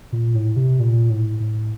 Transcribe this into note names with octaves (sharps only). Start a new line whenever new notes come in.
A#2
A2
C3
A#2
A2
A2